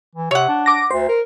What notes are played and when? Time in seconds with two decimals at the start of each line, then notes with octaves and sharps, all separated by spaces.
0.15 E3
0.31 C3 C#5 F#5
0.48 D4
0.66 D6 A#6
0.91 D2 C5
1.09 A#4